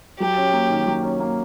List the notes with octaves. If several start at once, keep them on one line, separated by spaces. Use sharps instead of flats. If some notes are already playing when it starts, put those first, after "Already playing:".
F#3 G4
C#4
A#3
D#3
F#3
C#4
A#3